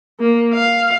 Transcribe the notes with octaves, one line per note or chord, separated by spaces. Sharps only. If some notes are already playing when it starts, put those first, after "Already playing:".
A#3
F5